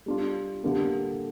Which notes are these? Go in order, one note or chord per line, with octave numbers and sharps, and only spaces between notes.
G3 D4 F4
D3 G3 A#3 D4 G4